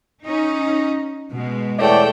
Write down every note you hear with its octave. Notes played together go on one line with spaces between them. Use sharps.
C#4 D#4
B2 G#3
E2 A3 C#5 D5 G5